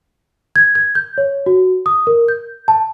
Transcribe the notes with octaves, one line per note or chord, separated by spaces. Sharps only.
G#6
G#6
G6
C#5
F#4
D#6
A#4
G6
A5